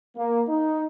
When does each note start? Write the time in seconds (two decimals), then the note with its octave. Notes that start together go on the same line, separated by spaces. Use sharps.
0.17 A#3
0.48 D#4